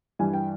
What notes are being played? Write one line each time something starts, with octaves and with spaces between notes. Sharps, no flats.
G2 E3 G3 G#5
G5